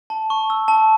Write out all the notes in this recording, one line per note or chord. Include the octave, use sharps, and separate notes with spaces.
A5
C#6
E6
A5